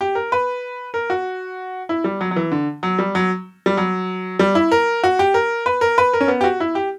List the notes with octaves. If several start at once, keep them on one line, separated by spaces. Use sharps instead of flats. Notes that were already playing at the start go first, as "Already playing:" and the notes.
G4
A#4
B4
A#4
F#4
E4
G3
F#3
F#3
E3
D3
F#3
G3
F#3
G3
F#3
G3
E4
A#4
F#4
G4
A#4
B4
A#4
B4
A#4
C#4
B3
G4
F#4
E4
G4